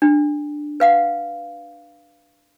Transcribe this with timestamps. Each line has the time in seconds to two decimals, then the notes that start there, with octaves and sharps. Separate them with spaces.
0.02 D4
0.80 B4 F5 F#5